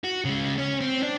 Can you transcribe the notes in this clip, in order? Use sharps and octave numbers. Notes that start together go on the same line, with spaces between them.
F#4
C#3 G#3
C#4
C4
D4